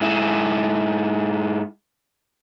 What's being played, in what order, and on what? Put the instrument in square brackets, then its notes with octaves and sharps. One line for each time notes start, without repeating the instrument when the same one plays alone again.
[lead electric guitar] G#2 E4